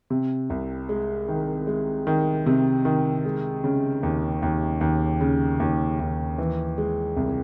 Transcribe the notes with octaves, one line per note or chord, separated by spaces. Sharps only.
C3
C2
G#3
D#3
G#3
D#3
C3
D#3
G#3
C#3
D#2
D#2
D#2
C#3
D#2
D#2
E3
G#3
C2